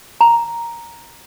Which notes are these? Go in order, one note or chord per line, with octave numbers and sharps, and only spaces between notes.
A#5